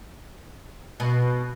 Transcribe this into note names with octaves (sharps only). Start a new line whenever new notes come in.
B2